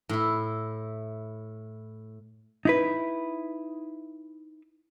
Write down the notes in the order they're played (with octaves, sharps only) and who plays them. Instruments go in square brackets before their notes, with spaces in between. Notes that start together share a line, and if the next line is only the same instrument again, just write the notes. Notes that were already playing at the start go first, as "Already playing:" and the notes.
[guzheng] A2 E4
[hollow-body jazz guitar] D#4 E4 B4